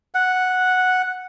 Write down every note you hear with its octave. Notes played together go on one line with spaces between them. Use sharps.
F#5